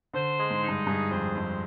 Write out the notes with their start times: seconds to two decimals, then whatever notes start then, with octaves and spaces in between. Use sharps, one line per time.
0.14 D3 C5
0.38 G#3
0.50 G#2
0.62 D#4
0.68 G2
0.86 G2 G#4
1.11 F2 C5
1.35 F2 G#3